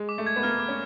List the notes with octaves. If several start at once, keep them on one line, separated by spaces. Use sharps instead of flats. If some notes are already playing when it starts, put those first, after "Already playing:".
Already playing: G#3
D6
A3
G#6
B3
A#3 F6
D6
C#4